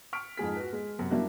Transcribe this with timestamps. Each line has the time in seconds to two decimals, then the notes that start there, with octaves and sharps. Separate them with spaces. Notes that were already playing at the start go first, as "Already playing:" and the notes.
0.13 C#6 F6 B6 D7
0.37 F2 G#2 G#4 B6
0.56 F#4 B4
0.73 G#3
0.99 F#2 C3
1.11 F#3 G3 A#3 D4 E4 F#4